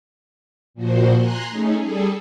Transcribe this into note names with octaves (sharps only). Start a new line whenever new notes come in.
A#2 F3 F#4 C5
G#5 A#5 C6 F#6
A3 C#4 D#4 G#4
G3 G#4 A4